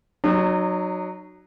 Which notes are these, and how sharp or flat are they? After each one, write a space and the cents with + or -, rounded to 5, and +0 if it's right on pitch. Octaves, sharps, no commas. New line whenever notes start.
F#3 +0 D#4 -35